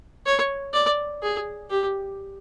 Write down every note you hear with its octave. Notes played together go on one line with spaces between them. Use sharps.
C#5
D5
G#4
G4